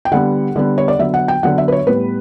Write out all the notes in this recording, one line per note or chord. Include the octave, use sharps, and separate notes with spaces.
G5
D3 G3 B3 F#5
D3 G3 B3
C#5
D5
D3 F#3 B3 E5
F#5
G5
D3 F#3 B3 F#5
E5
B4
C#5
A2 G3 B3 B4